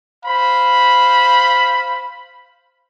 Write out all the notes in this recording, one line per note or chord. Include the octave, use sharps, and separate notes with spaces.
C5 F5 B5